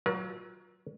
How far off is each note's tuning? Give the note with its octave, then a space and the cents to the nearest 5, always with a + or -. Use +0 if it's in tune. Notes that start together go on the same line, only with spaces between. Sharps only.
F#3 +15 F4 +30 A#4 +45